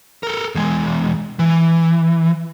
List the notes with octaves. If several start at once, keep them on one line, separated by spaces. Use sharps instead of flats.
A4 A#4
E2 G#3
E3